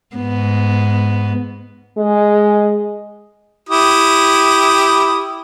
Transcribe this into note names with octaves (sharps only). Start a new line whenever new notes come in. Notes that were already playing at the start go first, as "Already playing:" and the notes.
G#2 B3
G#3
E4 G4 D#6